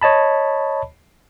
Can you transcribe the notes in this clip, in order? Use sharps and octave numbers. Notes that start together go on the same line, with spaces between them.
C#5 D#5 A5 B5